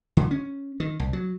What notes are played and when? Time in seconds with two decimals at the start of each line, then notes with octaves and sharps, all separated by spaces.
0.17 D3
0.31 C#4
0.80 D#3
1.00 C2
1.13 F#3